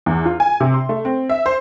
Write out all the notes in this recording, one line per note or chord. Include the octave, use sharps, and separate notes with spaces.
E2
F4
G#5
C3
C6
A3
C4
E5
C5